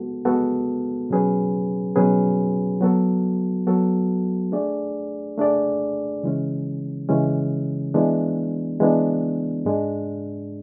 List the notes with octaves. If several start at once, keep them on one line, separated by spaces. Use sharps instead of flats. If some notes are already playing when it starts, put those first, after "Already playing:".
Already playing: G#3 B3 F#4 A4
G#3 B3 F#4 A4
B2 F#3 C#4 G#4 B4
B2 F#3 C#4 G#4 B4
F#3 B3 F#4 A4
F#3 B3 F#4 A4
A3 D4 G#4 D5
A3 D4 G#4 D5
C#3 E3 G#3 C#4
C#3 E3 G#3 C#4
E3 G#3 B3 D4
E3 G#3 B3 D4
G#2 G#3 D4